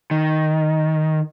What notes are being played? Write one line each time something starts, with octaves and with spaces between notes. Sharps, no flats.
D#3